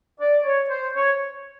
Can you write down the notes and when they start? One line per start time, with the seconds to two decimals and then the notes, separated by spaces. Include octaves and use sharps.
0.20 D5
0.44 C#5
0.69 C5
0.94 C#5